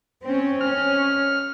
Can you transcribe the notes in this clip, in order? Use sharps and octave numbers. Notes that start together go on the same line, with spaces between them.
C4 C#4
C#4 F6